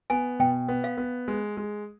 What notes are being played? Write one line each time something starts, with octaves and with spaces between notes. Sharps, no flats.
B3 G#5
B2 G5
B3
F5
B3
G#3
G#3